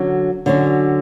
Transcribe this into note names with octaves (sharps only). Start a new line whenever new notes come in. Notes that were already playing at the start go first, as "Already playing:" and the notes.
Already playing: D3 F#3 C#4 F#4
D3 F#3 C#4 F#4